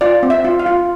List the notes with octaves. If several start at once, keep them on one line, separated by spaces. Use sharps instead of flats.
F4 D5
C4
E5
F4
F5
F4